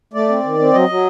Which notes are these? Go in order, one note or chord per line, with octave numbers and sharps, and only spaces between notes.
A3 D5
C4
D#3
C4
F#3 D#5
F#3